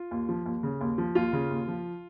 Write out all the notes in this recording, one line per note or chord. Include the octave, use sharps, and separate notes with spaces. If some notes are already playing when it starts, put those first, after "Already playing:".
Already playing: F4
D#2
F3
D#2
C#3
D#2
F3
D#2 F4
C#3
D#2
F3